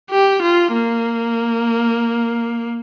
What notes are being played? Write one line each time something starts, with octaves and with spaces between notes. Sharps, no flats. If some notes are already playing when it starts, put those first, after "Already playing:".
G4
F4
A#3